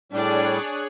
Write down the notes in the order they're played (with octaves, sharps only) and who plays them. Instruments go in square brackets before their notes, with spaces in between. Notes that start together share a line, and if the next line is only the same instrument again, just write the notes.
[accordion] A2 G3 [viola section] D4 D5 [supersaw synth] G#4 C#5 F#6